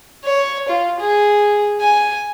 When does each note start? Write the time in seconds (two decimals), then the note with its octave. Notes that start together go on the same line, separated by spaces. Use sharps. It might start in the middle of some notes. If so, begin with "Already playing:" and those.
0.25 C#5
0.68 F4
1.00 G#4
1.80 G#5